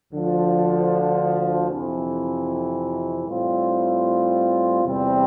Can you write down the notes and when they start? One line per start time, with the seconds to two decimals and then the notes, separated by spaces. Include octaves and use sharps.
0.12 D2 D3 F3
1.69 F2 C3 E3
3.27 A2 G3 C4 F4
4.84 E2 C3 G3 C4